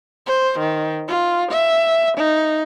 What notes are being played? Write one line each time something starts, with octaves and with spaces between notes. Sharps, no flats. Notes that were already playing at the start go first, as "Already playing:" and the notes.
C5
D#3
F4
E5
D#4